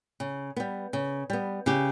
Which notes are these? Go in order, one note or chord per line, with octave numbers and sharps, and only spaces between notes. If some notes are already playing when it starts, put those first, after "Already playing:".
C#3
G3 B3
C#3
G3 B3
C#3 G4